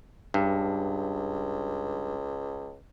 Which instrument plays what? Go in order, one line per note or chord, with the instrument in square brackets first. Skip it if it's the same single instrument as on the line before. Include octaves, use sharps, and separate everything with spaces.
[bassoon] C#2 [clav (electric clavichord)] G2